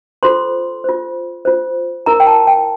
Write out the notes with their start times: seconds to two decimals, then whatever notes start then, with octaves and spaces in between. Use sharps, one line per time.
0.23 F4 A4 C5 C6
0.84 F4 C5
1.45 F4 C5
2.06 E4 A#4 A#5
2.20 G5
2.27 A5
2.47 G5